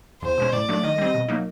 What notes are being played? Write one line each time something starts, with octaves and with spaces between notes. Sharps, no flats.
E2 C5
B2 G#3 C#4
A2 D5
F#3 A3 D4
D#3 D#5
G3 C4
B2
F#3 A#3 D#4